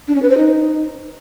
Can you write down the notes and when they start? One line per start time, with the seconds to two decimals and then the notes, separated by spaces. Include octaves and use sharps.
0.08 D4
0.15 C#4
0.23 B4
0.30 C5
0.37 D#4